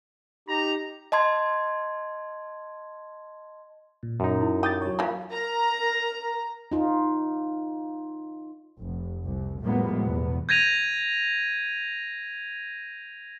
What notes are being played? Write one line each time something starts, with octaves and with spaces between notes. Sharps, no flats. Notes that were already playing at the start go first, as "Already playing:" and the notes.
D#4 G4 A#5
D#5 A5 C6 G#6
A#2
F#2 D#4
E4
G4 D#6 G6 A6
F#3 C#5
E3 A#3 F4 F5
A#4 A#5
D#4 F4
F1
C2
A2 F3 G3 G#3 A#3 B3
E2 B2 B3
G6 G#6 A#6 D#7 F7